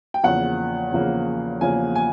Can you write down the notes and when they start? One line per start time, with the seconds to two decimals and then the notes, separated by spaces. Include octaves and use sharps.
0.14 G5
0.23 E2 C#3 F3 A#3 F#5
0.92 E2 C#3 F3 A#3
1.61 E2 C#3 F3 A#3 G#5
1.96 G#5